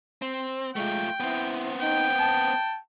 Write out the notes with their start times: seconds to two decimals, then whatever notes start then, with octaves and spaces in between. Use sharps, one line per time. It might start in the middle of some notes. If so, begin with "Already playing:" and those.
0.22 C4
0.76 G#3 A3 F4 G5
1.20 B3 C4 E4
1.82 D#4 G5
2.19 A5